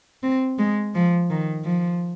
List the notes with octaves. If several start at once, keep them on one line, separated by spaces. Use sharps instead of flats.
C4
G#3
F3
D#3
F3